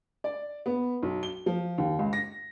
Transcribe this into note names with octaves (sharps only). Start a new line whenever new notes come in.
D5
B3
B1
G7
F3
D#2
C#2
A#6